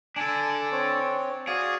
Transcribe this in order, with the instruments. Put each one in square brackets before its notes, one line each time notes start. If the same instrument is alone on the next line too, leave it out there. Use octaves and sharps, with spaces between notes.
[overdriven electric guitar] D4 A4 [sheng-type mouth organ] G#5
[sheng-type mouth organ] C4 C#5
[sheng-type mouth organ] F#4 D5 F5 [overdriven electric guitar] G#4